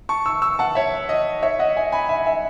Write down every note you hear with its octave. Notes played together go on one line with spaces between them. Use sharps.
A5 C#6
C#6 E6
C#6 E6
F#5 A5
C#5 E5
D#5
C#5 E5
D#5 F#5
E5 G#5
G#5 B5
E5 G#5
E5 G#5